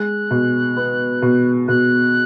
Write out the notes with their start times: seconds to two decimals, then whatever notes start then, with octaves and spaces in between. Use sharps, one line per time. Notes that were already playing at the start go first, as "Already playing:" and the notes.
Already playing: G#3 F#6
0.31 B2
0.77 B3
1.22 B2
1.68 B2 F#6